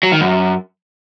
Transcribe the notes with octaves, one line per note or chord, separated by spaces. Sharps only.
F#3
D#3
F#2